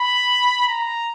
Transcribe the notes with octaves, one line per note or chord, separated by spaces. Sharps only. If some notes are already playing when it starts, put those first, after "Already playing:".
Already playing: B5
A#5